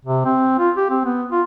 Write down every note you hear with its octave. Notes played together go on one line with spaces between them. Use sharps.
C3
C4
F4
G4
C4
B3
F4